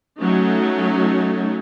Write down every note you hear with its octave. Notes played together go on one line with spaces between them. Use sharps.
F#3 A3 C#4 D#4